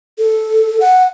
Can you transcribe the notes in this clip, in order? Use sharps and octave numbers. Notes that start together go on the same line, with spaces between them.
A4
F#5